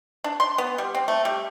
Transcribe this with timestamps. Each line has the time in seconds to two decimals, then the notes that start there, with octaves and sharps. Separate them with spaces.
0.24 D4
0.40 C6
0.58 B3
0.78 G3
0.95 C4
1.08 A3
1.25 G3